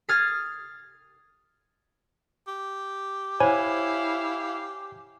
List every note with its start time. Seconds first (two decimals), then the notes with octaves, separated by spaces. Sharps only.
0.09 D#6 F6 G#6 A6 C7
2.47 G4
3.40 E4 C5 C#5 F5 G#5 B5